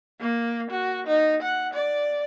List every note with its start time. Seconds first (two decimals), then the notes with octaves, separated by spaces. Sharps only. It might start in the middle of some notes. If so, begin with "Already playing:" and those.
0.20 A#3
0.71 F#4
1.07 D#4
1.42 F#5
1.74 D5